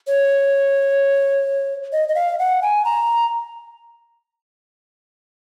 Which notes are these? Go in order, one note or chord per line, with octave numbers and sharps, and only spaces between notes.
C#5
D#5
D#5
F5
F#5
G#5
A#5